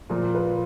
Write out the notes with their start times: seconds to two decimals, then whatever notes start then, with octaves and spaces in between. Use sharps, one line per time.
0.10 A#2 F3 A#4
0.35 B4